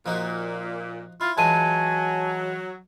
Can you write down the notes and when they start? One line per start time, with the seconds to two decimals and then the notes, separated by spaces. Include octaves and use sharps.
0.06 A#2 F3 D#4 F#4
1.21 E4 F4
1.38 E3 F#3 G#3 F4 G#5 A5 D#7